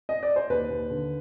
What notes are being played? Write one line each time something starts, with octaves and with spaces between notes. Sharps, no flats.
D#5
D5
C5
D#2 B4
D#2
D3